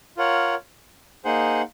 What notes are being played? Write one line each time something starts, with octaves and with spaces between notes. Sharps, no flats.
F4 A#4 C#5 F#5
A#3 D#4 G#4 C5 F#5